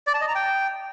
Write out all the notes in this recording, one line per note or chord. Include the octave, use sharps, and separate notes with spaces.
D5
A5
D#5
A#5
G5